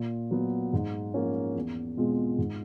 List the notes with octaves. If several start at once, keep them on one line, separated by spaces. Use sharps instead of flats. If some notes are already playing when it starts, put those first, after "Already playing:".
Already playing: A#2
F#3 B3
G#2
F3 A#3 C#4
E2
B2 G#3 C4 F4
G#2